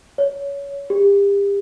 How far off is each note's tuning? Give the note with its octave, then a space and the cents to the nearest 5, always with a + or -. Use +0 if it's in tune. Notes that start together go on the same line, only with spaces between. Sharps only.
C#5 +20
G4 +35